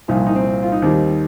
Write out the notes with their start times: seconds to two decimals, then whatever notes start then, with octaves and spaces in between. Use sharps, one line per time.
0.08 C2 A#2 F3 D#4
0.27 D#4
0.36 C4
0.62 F4
0.72 D#4
0.82 D#2 D#3 G3 C4